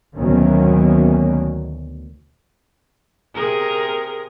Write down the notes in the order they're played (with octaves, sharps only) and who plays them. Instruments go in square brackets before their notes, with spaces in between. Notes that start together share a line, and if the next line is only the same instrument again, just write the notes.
[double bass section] D2 B2 D#3 F#3 A#3 C#4
[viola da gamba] C3 G#4 A#4